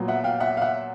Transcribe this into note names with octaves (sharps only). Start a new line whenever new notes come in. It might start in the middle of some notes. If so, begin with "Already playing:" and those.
Already playing: A#2 F#3 B3
E5 F#5
F5 G5
E5 F#5
F5
E5 F#5